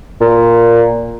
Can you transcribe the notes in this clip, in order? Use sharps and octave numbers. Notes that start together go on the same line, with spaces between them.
A#2